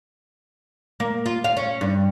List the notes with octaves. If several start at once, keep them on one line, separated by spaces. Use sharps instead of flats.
A#3
F4
F5
C#4
G2